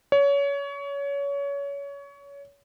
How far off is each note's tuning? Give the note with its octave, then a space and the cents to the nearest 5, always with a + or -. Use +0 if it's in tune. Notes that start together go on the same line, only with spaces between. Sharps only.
C#5 +25